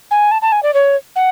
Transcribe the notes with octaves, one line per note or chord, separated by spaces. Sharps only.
G#5
A5
A5
G#5
D5
C#5
F#5